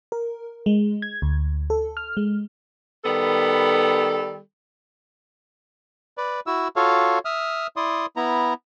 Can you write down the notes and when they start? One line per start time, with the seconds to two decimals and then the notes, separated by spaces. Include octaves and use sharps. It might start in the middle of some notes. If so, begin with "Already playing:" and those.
0.12 A#4
0.66 G#3
1.02 G#6
1.22 D2
1.70 A4
1.97 F6
2.17 G#3
3.04 D#3 G3 B3 A4
6.18 B4 D5
6.47 E4 F#4 E6
6.76 F4 F#4 A4 C#5 F5
7.25 E5 D#6 F6
7.76 E4 D5 C6 D#6
8.16 B3 E4 A#5